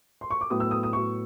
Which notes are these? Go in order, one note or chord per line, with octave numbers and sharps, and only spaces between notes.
C6
C#6
D6
A2 F#3 B3 D#6
E6
D#6
D#6
A2 F#3 B3 C#6